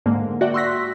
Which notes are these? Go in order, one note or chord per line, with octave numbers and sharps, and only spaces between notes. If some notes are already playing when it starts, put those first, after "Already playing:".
G#2 D3 G#3 A#3
F#4 A#4 D5 E5 F#5 G5
C6 C#6 E6 F#6 A#6 B6